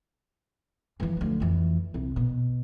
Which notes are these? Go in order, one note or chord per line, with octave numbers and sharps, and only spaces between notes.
E3 F3
D2 F3
F2 E3
C2
B2